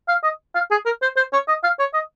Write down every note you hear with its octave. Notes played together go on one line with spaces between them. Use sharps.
F5
D#5
F5
G#4
A#4
C5
C5
C#5
D#5
F5
C#5
D#5